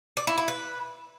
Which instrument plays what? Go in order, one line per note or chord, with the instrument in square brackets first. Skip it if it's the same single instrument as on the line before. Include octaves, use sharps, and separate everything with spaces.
[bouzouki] D5
E4
E4
B4